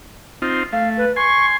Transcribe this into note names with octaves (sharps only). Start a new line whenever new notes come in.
C4 D#4 F4
A3 F5
B4
G#5 C6 C#6